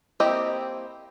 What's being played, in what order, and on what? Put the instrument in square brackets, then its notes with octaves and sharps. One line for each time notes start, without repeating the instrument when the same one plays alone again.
[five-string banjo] A#3 C4 E4 G4 D#5